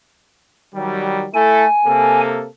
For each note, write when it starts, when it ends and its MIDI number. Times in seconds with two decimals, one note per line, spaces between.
0.74 1.27 51
0.74 1.27 54
0.74 1.27 55
1.34 1.65 57
1.34 1.65 64
1.34 1.65 69
1.34 2.20 80
1.85 2.47 48
1.85 2.47 58
1.85 2.47 69